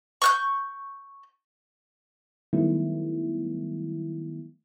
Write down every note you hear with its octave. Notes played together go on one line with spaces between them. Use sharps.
C#6 F#6 G6
D#3 F#3 G3 A3 B3 E4